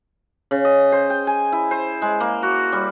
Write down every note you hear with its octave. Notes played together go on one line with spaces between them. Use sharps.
C#3
D#5
C5
G5
G#5
E4
C5
G#3
A#3
F#4
G3